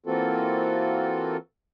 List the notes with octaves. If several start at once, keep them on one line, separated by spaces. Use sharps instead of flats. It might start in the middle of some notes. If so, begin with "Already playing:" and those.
E3 A#3 C4 F4 F#4 A4